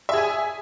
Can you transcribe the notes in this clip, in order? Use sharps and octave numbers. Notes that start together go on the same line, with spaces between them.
G#4 E5 G#5